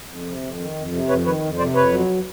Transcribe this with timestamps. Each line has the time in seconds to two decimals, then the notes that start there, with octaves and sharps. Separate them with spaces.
0.09 F2
0.26 C3
0.42 F2
0.59 D#3
0.75 F2
0.92 C3
1.08 F2 B4 C#5
1.25 D#3 B4 C#5
1.42 F2
1.58 C3 C5 D5
1.75 F2 B4 C#5
1.92 F#3